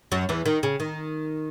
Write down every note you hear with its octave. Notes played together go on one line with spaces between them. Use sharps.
F#2 F#3
E2 E3
D#3
C#3
D#3